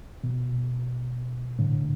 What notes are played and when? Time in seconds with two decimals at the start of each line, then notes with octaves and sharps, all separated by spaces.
0.24 B2
1.59 A2 D3